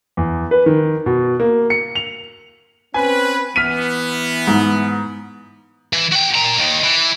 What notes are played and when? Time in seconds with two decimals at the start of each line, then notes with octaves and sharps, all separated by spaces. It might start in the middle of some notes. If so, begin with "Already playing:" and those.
0.17 E2
0.51 B4
0.66 D#3
1.06 B2
1.40 A#3
1.70 C#7
1.96 F7
2.94 C4 C#4 B4 G#5
3.56 E3 B3 F6 B6 D#7
4.47 G#2
5.93 E3
6.12 F#4 G5
6.35 A#2 A#5
6.59 D#2 D#3
6.84 E3